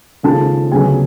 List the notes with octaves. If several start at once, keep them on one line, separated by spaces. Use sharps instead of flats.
D#2 C#3 F3 G#3 A4 A5
D2 C#3 F#3 B3 G#4 G#5